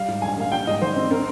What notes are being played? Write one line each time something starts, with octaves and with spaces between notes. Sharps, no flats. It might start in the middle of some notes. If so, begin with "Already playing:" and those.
Already playing: G3 F5
G#2
A#1 G#5
A#3 F5
G3 G5
G#2 D#5
G#1 C5
C4
C4 A#4